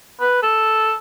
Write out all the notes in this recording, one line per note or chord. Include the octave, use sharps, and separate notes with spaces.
B4
A4